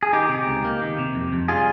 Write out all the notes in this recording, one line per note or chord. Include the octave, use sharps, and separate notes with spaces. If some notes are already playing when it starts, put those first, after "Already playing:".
G#4
D#3 D#4 G4
C3
C#2
A#3
D#3
C3
F2
F2
G3 F4 G#4